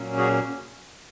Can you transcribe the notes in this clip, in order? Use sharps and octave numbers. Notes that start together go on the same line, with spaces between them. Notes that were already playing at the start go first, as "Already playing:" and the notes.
Already playing: A#2 F#3 A#3 C#4
F#4 G#4